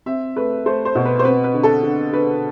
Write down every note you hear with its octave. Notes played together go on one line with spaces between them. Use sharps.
C4 E5
A3 B4
A3 C5
C5
B2
B4
C5
C4 B4
B4
D3
A4
D3
D3 B4